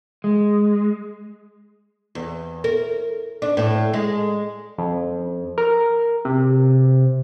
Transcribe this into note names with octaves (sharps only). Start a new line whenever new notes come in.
G#3
E2
A#4
D4
A2
G#3
F2
A#4
C3